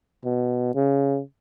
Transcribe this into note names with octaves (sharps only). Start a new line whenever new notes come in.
B2
C#3